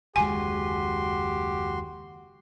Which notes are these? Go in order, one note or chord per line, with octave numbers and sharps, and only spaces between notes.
F#1 D#2 G#3 F#4 G4 G#5 C6